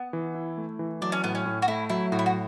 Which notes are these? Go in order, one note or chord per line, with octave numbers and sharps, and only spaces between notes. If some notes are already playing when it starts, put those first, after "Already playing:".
Already playing: B3
E3
E4
A3
E3
F#3 D4
C#4
A2 B3
C#4
A2
F#4
A3 E4
F#3 E4
A2 F#4
E4
F#4